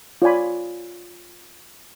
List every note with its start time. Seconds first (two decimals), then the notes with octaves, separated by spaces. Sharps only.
0.22 F4 C#5 D5 G#5 B5